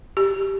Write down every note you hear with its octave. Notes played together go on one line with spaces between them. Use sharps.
G4